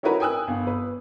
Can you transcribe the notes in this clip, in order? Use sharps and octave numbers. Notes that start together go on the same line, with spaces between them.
C#4 D#4 E4 F#4 A#4 B4
G5 G#5 D#6 E6 F#6
G1
B4